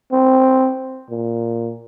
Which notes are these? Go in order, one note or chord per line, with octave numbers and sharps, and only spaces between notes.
C4
A#2